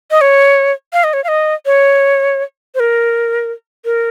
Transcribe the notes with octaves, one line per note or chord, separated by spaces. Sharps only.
D#5
C#5
F5
D#5
C#5
F5
D#5
C#5
C5
A#4
A#4